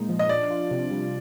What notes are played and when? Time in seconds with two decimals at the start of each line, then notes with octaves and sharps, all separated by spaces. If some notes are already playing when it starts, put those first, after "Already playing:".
Already playing: A#2 G#3 D#4
0.09 F3
0.19 D#5
0.29 D4 D5
0.51 F4
0.71 C3
0.91 G3